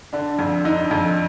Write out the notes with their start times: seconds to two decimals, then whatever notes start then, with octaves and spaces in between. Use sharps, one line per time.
0.13 D3 D4
0.39 F2
0.64 D3 D#4
0.91 F2